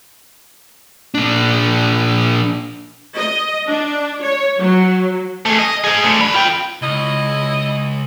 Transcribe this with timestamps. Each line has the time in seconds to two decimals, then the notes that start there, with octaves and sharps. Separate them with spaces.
1.14 A#2 D4
3.17 D#5
3.67 D4
4.22 C#5
4.59 F#3
5.46 A3 G#4
5.59 D#5
5.84 D#4 G#4
6.04 D3 A3
6.21 A#4 B5
6.34 F4 G5
6.82 C#2 E4 D#5